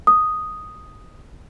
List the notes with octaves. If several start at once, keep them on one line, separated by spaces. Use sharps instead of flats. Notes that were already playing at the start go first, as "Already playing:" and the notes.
D#6